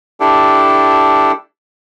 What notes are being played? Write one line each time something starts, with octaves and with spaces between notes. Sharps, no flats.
D4 E4 G4 A4